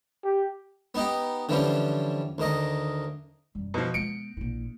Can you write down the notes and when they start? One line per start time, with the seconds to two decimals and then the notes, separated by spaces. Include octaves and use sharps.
0.25 G4
0.95 B3 D#4 G4
1.49 D3 E3 F3 G3 C#4
2.38 D2 D#3 D#5
3.55 F#2 G3
3.74 B2 F3
3.94 G#3 B3 C#7 D7
4.37 A#1 E4